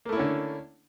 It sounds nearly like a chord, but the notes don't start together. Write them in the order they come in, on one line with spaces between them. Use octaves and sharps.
A#3 A3 E4 C#4 D3